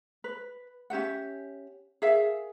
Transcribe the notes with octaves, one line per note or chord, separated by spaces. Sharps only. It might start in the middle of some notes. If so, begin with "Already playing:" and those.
B4
C#4 G4 E5 F#5
G#4 A#4 E5 F5